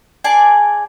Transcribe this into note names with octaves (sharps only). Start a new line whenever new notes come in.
G#4 D5 G#5 A5